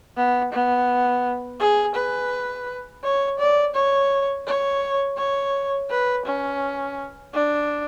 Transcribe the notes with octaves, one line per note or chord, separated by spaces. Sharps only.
B3
B3
G#4
B4
C#5
D5
C#5
C#5
C#5
B4
C#4
D4